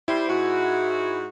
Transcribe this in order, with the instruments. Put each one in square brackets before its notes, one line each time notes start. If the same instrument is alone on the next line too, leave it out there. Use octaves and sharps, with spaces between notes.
[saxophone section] G3 C5 [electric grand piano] E4
[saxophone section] G#2 F#4